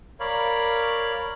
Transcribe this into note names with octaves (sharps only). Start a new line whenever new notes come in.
A#4 C#5 D5 F5 B5